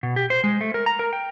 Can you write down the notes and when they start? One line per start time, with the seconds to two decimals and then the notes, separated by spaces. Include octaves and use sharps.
0.03 B2
0.16 G4
0.30 C5
0.44 G#3
0.61 A3
0.74 A#4
0.86 A#5
0.99 A#4
1.13 G5